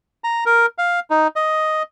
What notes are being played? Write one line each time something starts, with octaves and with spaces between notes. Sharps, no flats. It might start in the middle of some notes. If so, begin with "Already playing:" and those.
A#5
A#4
F5
D#4
D#5